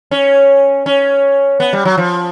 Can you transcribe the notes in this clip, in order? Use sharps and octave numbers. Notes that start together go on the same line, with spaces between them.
C#4
C#4
B3
G3
F#3
F3